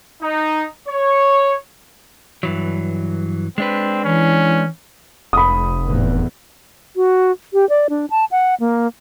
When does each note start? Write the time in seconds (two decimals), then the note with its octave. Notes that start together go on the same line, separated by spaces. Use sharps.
0.23 D#4
0.87 C#5
2.43 G2 E3 F#3
3.58 G#3 C4 D4 B4
4.04 E3 C#4
5.33 F1 B5 D#6
5.85 E2 A2
6.96 F#4
7.53 G4
7.69 D5
7.90 D4
8.10 A5
8.31 F#5
8.60 A#3